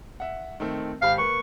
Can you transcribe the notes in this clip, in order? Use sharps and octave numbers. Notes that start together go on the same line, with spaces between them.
E5 F#5
D#3 A3 C4
G#1 G4 F5 B5
A#3 B4 C#6